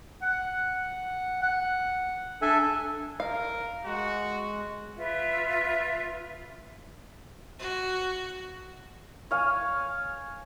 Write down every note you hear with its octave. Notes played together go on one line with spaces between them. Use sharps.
F#5
F#5
D4 A4 E5 G#5
A#4 F5
G#3 F#4
F4 B4 E5
F#4
C#5 F5 G#5